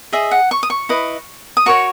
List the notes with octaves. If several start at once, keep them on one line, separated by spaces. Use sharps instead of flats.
G#4 D#5 E5
F#5
C#6
D#6
C#6
E4 B4 D#5
D#6
F#4 A#4 C#5 C#6